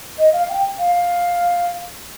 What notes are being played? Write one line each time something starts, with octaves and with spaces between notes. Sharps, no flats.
D#5
F5
G5
F5